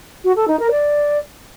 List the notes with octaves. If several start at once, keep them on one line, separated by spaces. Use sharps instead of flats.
F#4
A4
D#4
A#4
D5